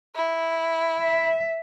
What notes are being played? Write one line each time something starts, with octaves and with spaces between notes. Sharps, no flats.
E4
E5